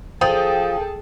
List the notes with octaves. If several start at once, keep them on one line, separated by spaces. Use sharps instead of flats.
F3 G#4 A4 G5 A5 D#6